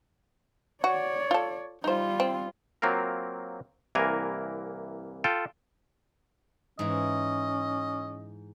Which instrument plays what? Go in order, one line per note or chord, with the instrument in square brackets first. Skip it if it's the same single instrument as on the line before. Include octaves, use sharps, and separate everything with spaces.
[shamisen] F#4 [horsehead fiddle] C#5 D5
[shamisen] F4 A4
[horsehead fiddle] G3 F4 [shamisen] D#4 C5
[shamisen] C4
[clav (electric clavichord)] F#3 A#3 C4 F4 A#4
C2 E3 A#3 A#4 G#5
F4 A4 G5
[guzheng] G#2 E3 [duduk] C#4 [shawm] D#5